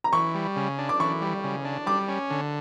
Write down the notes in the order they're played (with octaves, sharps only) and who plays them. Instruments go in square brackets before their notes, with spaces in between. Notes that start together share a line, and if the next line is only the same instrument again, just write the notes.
[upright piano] A#5
[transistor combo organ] E3 [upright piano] C#6
[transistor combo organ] G3
C#3
D4
[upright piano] D6
[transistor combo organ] E3 [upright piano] C#6
[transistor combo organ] G3
C#3
D4
[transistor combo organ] G3 [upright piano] D6
[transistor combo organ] C#4
D3